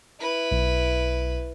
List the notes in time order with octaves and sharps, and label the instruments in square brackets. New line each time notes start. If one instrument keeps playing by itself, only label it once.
[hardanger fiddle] E4 B4
[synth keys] B1